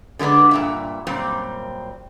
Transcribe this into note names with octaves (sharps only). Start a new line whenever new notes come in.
D3 G#3 A#3 B3 D4
G2 A#2 E5
F#2 A#2 G3 C4